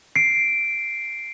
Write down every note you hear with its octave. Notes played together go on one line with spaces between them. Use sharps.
C7 D7